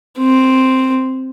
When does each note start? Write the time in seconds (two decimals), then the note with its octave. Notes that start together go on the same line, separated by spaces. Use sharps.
0.19 C4